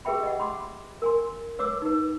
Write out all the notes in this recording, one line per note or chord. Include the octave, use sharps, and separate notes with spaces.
G4 G#4 B4 E5 G5 B5
D#5 F#5
B5 C6 D6
A#4 G#5 C6
B4 C#5 D6 E6
D#4 B4